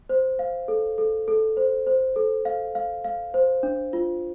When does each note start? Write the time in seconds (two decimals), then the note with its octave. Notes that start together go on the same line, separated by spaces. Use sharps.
0.09 C5
0.39 F5
0.68 A4
0.98 A4
1.28 A4
1.57 C5
1.87 C5
2.16 A4
2.45 F5
2.75 F5
3.04 F5
3.34 C5
3.63 D4
3.93 F4